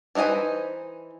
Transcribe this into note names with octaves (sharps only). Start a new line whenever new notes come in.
E3 D#4 B4 C5 G#5